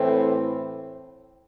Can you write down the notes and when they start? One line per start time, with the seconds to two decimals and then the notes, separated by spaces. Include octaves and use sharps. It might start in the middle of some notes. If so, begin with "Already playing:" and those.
Already playing: A2 E3 C4